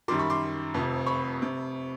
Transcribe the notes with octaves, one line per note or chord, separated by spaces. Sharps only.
F#2 D#3 G3 C6 D6
B5 C#6
C6 D6
F1 F2 C3
B5 C#6
C3